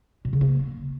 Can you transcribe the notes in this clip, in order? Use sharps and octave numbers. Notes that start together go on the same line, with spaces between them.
A#2
C#3
A#3